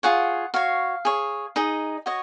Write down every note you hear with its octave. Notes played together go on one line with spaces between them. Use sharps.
F4 G#4 C#5 F#5
F#4 C#5 F5
G#4 C#5
D#4 G#4 D#5
F#4 C#5 D#5